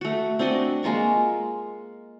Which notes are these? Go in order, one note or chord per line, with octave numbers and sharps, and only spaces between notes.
A3 F#4
C4 D4 F#4 D#5
G#3 A#3 F4 C#6